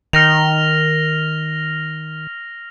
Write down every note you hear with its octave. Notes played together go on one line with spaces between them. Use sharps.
D#3 F6 A#6 F7